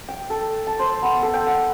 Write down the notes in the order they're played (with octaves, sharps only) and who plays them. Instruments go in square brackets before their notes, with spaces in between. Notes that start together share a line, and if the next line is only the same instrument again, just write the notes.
[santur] G5
A4
A5
C5
B3
A4
G5
F#5